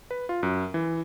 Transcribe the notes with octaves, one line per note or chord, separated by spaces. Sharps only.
B4
F4
F#2
E3